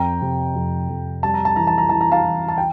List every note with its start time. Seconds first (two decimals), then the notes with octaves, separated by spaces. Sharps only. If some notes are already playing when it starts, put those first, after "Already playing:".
Already playing: F2 G5 A#5
0.21 C3
0.55 F2
0.89 F2
1.23 G3 A5
1.34 A#5
1.45 A5
1.56 E3 A#5
1.67 A5
1.78 A#5
1.89 E3 A5
2.01 A#5
2.12 F5 A5
2.24 E3
2.48 A5
2.58 G5